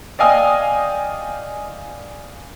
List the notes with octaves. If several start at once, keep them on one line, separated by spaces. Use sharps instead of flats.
D5 D#5 F5 G5 G#5 D#6